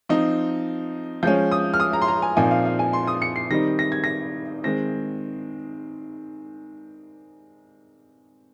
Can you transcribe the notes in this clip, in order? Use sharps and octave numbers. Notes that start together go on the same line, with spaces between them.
F3 C4 D#4
F3 G#3 C#4 G6
D#6
F6
D#6
A#5
C6
A#5
G#5
A#2 F3 C4 D#4 G#5
F5
F5
G#5
C6
D#6
C#7
C7
D#3 G3 C4 D#4 A#6
A#6
G#6
A#6
D#3 G#3 C4 A#6